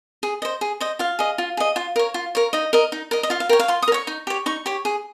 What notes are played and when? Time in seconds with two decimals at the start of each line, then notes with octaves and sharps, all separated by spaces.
0.23 G#4
0.42 C5 D#5
0.61 G#4
0.80 C5 D#5
0.99 F4 F5
1.19 G#4 D#5
1.38 F4
1.57 G#4 D#5
1.76 F4
1.96 A#4 C#5
2.14 F4
2.35 A#4 C#5
2.53 D#4 D#5
2.73 A#4 D#5
2.92 D#4
3.11 A#4 D#5
3.23 D#5
3.30 F4 F5
3.40 F5
3.49 A#4 C#5 G5
3.59 F5
3.68 F4 C6
3.82 D#6
3.88 A#4
3.92 C#5 C#6
4.07 D#4
4.27 G4 C#5
4.46 D#4 C#6
4.66 G4 C#5
4.85 G#4